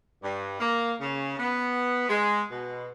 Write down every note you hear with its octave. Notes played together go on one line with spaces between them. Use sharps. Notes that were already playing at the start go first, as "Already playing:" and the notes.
G2
A#3
C#3
B3
G#3
B2